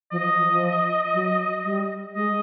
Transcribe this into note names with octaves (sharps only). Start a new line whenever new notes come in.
F3 D#5
F3
F3
F3
F#3
G3
G#3 D#5